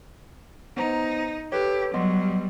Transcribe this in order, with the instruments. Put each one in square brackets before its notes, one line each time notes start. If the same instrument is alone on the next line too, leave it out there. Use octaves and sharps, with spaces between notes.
[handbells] B3 C5 A#5 [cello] D#4
[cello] G4 [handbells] A4 B4 C#5
[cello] F#3 G3 [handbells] B3 D#5 C6